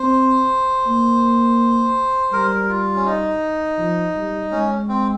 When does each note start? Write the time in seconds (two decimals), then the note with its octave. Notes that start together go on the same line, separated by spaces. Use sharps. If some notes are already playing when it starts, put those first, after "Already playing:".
Already playing: C4 C5
0.87 A#3
2.32 G3 A#4
2.69 F4
2.96 C#4
3.06 D#4
3.78 F3
4.16 G3
4.51 G#3 C#4
4.88 C4